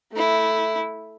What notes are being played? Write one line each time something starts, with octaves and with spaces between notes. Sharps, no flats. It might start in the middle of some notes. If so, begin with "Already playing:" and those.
A3 E4